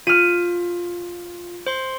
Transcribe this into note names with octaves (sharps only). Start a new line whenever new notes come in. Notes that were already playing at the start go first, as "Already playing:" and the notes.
F4 F6 D#7
C5 C6